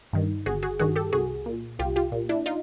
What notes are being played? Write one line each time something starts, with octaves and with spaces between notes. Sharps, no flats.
G2 D#3
G1 F#4 G#4
F#4 G#4
G2 D#3 F#4 G#4
G4 A4
C2 F#4 G#4
A#2
C2 F4 G4
F4 G4
A#2
D4 E4
D#4 F4